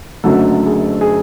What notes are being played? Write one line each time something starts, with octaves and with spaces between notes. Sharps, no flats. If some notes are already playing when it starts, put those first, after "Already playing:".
F#1 F#2 D3 F#3 A3 A4
G#4
G#4